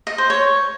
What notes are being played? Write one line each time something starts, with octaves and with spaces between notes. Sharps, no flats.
D#5
C5
C#5